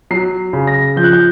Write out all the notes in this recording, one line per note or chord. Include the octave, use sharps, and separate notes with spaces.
F#3 C7
C#3
A#6
F3 G6
F#6
G6